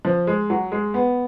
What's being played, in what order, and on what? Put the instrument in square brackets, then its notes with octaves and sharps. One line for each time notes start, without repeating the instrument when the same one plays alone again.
[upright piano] F3
G#3
F#3
G#3
B3